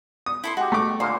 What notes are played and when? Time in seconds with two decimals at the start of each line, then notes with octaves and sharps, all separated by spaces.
0.26 D#6
0.44 E4 A4 C6
0.57 G#3 F#4 G4
0.72 A3 D6
1.00 A#2 D3 A#3 C5